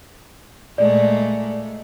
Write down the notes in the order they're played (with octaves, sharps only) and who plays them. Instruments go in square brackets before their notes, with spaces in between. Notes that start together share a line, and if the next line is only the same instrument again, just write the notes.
[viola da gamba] A#2 G#3 A3 [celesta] D5